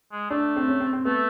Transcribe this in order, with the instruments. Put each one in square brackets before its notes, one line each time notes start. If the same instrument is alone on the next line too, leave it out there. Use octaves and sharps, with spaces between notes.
[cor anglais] G#3
[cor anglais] A3 [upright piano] D4
[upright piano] C4
C#4
C4
C4
[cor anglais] A3 [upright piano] B3